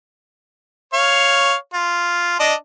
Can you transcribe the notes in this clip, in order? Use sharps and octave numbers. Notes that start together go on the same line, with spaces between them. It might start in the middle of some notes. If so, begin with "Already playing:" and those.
C#5 F5
F4
D4 D#5